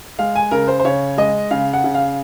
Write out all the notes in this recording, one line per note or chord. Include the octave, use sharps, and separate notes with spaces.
G#3 F5
G#5
C#3 A#4
C5
C5
C#3 C#5
G#3 D#5
C#3 F5
F#5
C#3
F5